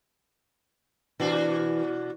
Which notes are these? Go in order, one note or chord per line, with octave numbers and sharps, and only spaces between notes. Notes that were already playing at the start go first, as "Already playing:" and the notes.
B2 E3 D4 F#4